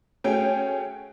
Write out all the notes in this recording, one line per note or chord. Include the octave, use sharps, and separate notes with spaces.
A3 C#4 F#4 G#4 G5